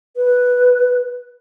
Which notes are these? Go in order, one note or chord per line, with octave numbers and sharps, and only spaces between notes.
B4